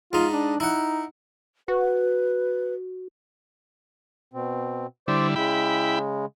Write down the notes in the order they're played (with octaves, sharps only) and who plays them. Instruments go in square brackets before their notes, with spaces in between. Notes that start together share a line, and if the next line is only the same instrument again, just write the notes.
[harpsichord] G#2 D#4 [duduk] F4
[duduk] D4
[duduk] D#4 [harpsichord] E4 F#5
[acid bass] F#4 [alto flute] B4
[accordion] B2 C4
[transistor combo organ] D3 G3 E4 [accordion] C5 D5 D6
[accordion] C#3 G#3 [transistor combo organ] E4 G5 B5